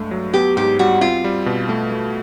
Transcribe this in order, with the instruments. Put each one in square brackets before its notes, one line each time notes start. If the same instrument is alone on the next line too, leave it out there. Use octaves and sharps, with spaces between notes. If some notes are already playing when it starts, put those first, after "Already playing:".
Already playing: [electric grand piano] G2 G#3 A3
F#3
[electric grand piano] B3 [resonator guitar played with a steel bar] G4
[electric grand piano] G#2 [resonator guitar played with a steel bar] G4
[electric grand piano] G3 [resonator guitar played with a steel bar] F#4
[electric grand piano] C4 [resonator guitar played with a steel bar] F4
[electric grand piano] G3
B2
A3
A3